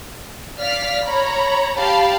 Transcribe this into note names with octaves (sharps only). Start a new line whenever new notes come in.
D5 F5 F6 B6
C#5 A#5 B5
G4 F5 A5 B5